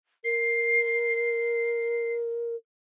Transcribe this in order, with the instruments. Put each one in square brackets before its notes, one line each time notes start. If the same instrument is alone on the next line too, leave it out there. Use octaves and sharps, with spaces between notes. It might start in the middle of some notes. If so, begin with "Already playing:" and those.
[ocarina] A#4 [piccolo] C7